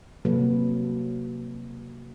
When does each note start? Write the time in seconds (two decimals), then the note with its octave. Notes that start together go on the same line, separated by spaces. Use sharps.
0.25 C3 F#3 A#3 F#4 A4 B4